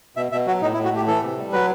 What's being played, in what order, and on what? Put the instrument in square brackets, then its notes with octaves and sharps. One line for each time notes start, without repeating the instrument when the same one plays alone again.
[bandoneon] B2 E5
B2 E5
F#3 F#4
A2 D#4
E4
A2
F#4
A3 G4
E3 A4
C3
G3
F#3 B4